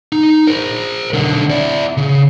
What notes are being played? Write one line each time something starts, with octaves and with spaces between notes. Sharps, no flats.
D#4
A#4 C5
B1 D3
E4 D5
C#3